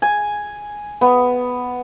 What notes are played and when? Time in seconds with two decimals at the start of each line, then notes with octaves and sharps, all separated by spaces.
0.02 G#5
1.01 B3